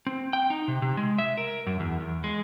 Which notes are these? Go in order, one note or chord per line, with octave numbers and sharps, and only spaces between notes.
C4
G5
D#4
C3
C3
G#3
E5
A#4
F#2
E2
E2
G#3